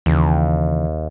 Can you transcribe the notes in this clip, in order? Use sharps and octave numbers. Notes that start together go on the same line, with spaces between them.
D#2 C#3 E3